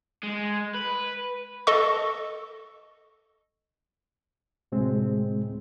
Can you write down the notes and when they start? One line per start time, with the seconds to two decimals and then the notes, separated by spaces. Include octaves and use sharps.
0.23 G#3
0.75 B4
1.67 A4 D#5 C#6
4.72 D2 A2 C3 G#3 C4